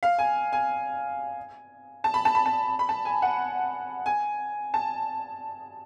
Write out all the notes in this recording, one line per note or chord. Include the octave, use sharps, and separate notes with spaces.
F5
G#5
G#5
A5
B5
A5
B5
A5
B5
A5
G#5
F#5
G#5
A5